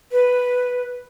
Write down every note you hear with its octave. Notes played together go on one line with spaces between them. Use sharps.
B4